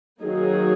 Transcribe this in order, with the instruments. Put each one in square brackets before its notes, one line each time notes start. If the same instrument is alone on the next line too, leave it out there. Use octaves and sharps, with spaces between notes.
[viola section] D#3 F#3 A#3 D#4 G#4